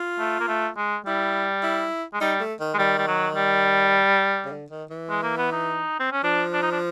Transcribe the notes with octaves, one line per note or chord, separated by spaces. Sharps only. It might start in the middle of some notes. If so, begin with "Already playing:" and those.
Already playing: F4
A3
A#3
A3
G#3
G3 E4
E4
G#3
G3 D#4
A3
D#3
G#3
D#3 G3
G3
F#3
G3
C#3
D3
D#3
E3
G#3
A#3
B3
D#4
C4
C#4
F3 D4
D4
D#4
D4